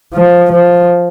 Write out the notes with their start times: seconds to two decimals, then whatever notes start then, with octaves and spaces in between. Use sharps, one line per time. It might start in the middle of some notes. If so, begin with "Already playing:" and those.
0.13 F3
0.52 F3